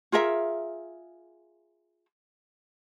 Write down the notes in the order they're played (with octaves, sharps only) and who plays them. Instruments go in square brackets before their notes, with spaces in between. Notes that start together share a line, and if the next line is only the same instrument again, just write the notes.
[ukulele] F4 G#4 A#4 E5